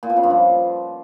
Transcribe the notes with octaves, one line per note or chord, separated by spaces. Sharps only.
A#2
B2
C#3
G2
F3